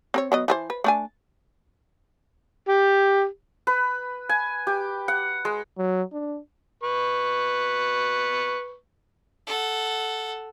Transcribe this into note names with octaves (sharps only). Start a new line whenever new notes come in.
C4 A#4 C#5
F#3 B3 D#5
E3 G#4 C5
B4
A3 D4 G#5
G4
B4
G#5
G4
F#5
G#3
F#3
D4
B4 C#6
A4 F#5